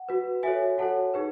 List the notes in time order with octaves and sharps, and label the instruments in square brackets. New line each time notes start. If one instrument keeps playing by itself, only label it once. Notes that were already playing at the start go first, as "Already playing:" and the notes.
Already playing: [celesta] F#5
F#4 B4
F#4 A4 C#5 E5 G#5
F#4 A4 C#5 F#5 A5
D#4 G#4 B4